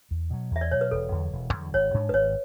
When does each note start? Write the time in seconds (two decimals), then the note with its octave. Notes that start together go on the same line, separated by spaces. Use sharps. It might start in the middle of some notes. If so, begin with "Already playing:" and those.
0.11 E2
0.30 B2 F#3
0.51 E2 E5
0.61 D5
0.71 B2 F#3 C#5
0.81 B4
0.91 E1 A4
1.12 E2 D3 F#3
1.33 E1
1.53 E2 D3 F#3
1.74 G#1 C#5
1.94 G#2 G#3 D4
2.09 B4
2.14 G#1 C#5